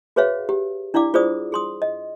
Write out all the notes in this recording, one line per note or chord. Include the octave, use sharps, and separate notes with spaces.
F#4 G#4 B4 C#5 E5 F5
G4
D4 E4 D5 F5 D6
F4 G#4 C5 D5 D#6
G#4 C6 D#6
D#5